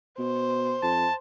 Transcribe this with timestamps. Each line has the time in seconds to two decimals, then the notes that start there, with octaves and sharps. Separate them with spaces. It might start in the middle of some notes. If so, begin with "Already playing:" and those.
0.19 B2 C5
0.83 F2 A5